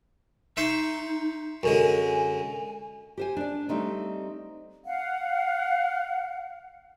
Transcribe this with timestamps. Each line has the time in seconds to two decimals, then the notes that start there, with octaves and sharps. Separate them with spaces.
0.57 D#4 E5 C6 C#6
1.63 F#2 D3 G#3 G#5
3.17 G4 C5 G#5
3.37 D4 D5
3.69 G3 A3 C4 D#4
4.85 F5 F#5